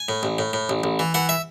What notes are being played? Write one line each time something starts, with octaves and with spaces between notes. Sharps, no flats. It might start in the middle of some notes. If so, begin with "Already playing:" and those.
Already playing: G#5
A2
A1
A2
A2
A1
A1
E3
E3 F#5
E5